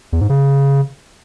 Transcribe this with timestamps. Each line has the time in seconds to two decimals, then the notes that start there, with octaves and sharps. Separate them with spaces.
0.12 E2
0.21 G#2
0.29 C#3